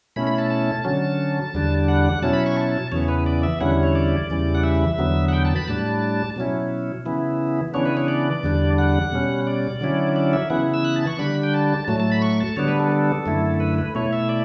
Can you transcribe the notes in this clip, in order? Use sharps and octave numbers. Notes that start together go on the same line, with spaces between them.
B2 A3 C#4 E4 B5
B5
A5
A5
D3 F#3 C#4
E2 D3 G3 D4
F#5
B2 F#3 C#4 E4 A5
B5
C#6
A5
E2 C#3 E3 B3 C#5
C#5
B4
D5
E5
E2 D3 G3 C#4 E4 F#5
C#5
D5
E2 C#3 E3 G3
F#5
E5
E2 D3 F#3 B3
F#5
G5
A5
B5
A2 G3 D4 A5
B2 F#3 C#4 E4
C#3 E3 B3 E4
C#3 E3 B3 D4 C#5
B4
C#5
D5
E2 D3 G3 D4
F#5
B2 G3 C#4
D5
D3 F#3 C#4 E4
D5
E5
C#3 E3 B3 E4 F#5
E6
F#6
A5
C#6
D3 G3 D4 B5
G5
A5
A2 F#3 A3 A5
A5
B5
C#6
A5
D3 G3 B3 D4 C#5
B4
A4
A4
F#2 D3 A3 E4
B4
B4
B2 A3 E4 C#5
E5
D5